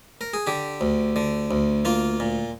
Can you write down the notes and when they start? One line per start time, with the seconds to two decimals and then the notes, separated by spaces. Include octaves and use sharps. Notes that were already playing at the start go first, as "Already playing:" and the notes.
0.21 A#4
0.34 G#4
0.47 D3 G4
0.81 D2
1.16 D3
1.51 D2
1.85 A#3 F4
2.20 A#2